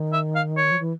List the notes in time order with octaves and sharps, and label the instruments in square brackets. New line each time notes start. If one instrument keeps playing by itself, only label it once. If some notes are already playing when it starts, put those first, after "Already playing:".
Already playing: [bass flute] D#3
[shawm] E5
F5
C#5
[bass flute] F3
E3